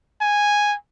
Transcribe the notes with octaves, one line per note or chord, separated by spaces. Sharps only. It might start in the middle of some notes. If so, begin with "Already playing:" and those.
G#5